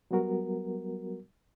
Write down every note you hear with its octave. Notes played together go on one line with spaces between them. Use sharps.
F#3 G3 B3 F#4 A#4